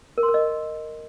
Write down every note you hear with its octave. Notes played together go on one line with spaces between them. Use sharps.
A#4
C6
A#4
D#5